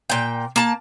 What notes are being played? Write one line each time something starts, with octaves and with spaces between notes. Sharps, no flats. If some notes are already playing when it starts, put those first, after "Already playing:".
A#2 G5
A#3 A5